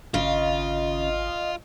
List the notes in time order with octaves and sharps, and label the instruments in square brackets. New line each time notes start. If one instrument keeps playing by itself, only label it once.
[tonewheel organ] G#1 [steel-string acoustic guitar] C#3 [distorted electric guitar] F4 [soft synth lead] D#5